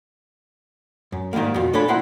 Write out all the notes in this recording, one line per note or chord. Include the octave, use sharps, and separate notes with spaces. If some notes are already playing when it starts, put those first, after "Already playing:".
F#2
G#2 D#3 E3 G3 A#3
F2 B2
A#2 D4 A4 C#5 B5
B1 A#3 E4 C5 F#5